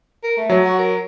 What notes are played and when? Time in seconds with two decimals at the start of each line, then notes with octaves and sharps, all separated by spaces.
0.23 A#4
0.37 A3
0.50 F#3
0.65 F#4
0.78 A#4